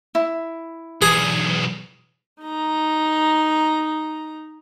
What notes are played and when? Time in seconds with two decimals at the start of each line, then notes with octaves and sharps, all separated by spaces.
0.15 E4
1.02 B1 E2 G#4
2.41 D#4 A#5